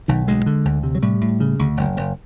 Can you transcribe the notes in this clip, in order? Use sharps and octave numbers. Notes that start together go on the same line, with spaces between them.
B1 D#3
D2 G#3
D3
D2
C3
F#3
A2 G3
A2
C#3
D2
F#1
F#1